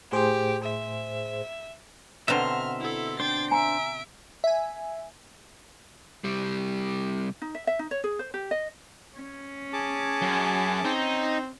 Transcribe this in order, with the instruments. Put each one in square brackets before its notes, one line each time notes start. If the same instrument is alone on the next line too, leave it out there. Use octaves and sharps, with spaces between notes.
[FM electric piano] A2 G#4 C5 [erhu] G4
[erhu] E5
[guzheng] B2 D3 C4 [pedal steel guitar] E5 A#5 C6 [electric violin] F6 [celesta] E7
[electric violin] E4 A4
[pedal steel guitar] D4 C5 [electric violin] G5 A6
[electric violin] E5 D7 [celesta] G#5 A#5
[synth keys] E5 G#5
[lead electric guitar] C3 G3
[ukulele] D#4
E5
E5
D#4
C#5
G#4
C5
G4
D#5
[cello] C#4
[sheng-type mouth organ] G#4 A5 D6
[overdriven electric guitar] F#2
[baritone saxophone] C4 [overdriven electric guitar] D#4